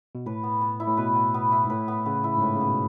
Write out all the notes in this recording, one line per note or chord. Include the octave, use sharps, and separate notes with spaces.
B2
A2 B4
B3
B3
E4
A2
B2 B4
B3
B3
E4
G#2
A2 B4
B3
C#3 B3
E4
G#2
A2 B4
C#3
B3
B2